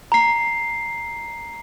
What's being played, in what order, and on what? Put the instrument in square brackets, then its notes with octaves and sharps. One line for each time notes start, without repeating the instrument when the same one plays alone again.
[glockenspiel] A#5 C7